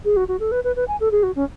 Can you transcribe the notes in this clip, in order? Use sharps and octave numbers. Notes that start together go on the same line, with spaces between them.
G#4
F#4
F#4
A4
B4
B4
B4
G#5
A4
G#4
F#4
C#4